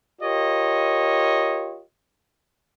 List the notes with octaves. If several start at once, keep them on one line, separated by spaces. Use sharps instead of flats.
F4 G4 A#4 C#5 D#5